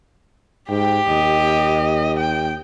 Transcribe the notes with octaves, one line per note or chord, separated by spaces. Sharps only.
G#2 G4 G5
D#2 D#5
G5